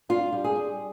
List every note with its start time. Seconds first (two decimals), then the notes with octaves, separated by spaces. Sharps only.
0.09 D4 F4
0.33 G3
0.44 G#4
0.56 G3